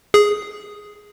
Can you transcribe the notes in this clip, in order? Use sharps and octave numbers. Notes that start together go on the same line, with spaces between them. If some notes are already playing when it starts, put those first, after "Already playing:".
G#4